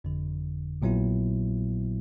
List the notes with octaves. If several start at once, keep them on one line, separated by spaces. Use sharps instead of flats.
G1 F2 D3
A#1 A#2 F#3 B3 E4